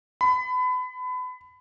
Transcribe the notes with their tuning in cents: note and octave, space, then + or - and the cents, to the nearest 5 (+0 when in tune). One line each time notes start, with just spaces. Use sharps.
B5 +30